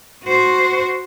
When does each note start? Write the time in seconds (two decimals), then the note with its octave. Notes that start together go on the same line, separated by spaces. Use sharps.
0.24 F#4 C5